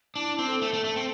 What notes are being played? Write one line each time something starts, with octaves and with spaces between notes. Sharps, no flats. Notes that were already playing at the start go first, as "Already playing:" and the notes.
D4 E4
E4
C4
A4
A3
A3
A3
C4